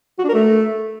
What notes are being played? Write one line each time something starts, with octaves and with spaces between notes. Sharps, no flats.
F#4
D4
A#4
A3